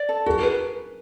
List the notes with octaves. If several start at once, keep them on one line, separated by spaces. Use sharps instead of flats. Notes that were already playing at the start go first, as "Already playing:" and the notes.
Already playing: D5
A4
F#4 G#4 A#4
B4